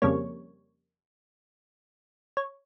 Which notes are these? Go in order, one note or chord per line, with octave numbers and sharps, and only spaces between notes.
F2 C#3 G3 A#3 C#5
C#5